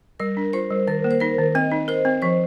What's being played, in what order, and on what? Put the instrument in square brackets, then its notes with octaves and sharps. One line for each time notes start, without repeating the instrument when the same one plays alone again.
[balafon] G3 [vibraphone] A#4
[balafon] D4
[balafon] F4 [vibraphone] C5
[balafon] G3
[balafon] D#3 [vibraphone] A#4
[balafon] A#3
[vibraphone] C5
[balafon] D#4 [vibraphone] A#4
[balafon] D#3
[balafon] C4 [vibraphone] D#5
[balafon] D#4
[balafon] A#4 [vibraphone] C5
[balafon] C4
[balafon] F3 [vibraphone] C5